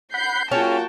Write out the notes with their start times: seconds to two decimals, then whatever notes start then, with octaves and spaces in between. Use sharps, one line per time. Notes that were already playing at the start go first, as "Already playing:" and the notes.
0.14 F#5 B5 G6 C7
0.52 F#3 A#3 C#4 F4 F#4 G#4 G5 A5